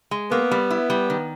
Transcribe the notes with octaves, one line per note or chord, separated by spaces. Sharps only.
G#3
A#3 B3
G3
E4
G3
D#3